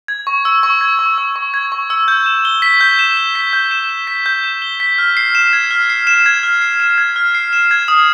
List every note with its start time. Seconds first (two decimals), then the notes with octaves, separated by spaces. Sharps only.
0.08 G#6
0.27 C#6
0.45 E6
0.63 C#6
0.81 G#6
0.99 C#6
1.18 E6
1.36 C#6
1.54 G#6
1.72 C#6
1.90 E6
2.08 G6
2.26 E7
2.45 G7
2.62 B6
2.81 G6
2.99 E7
3.17 G7
3.35 B6
3.53 G6
3.71 E7
3.90 G7
4.07 B6
4.26 G6
4.44 E7
4.62 G7
4.80 B6
4.98 F6
5.17 C7
5.35 E7
5.53 G#6
5.71 F6
5.90 C7
6.07 E7
6.26 G#6
6.43 F6
6.61 C7
6.80 E7
6.98 G#6
7.16 F6
7.35 C7
7.53 E7
7.71 G#6
7.88 D#6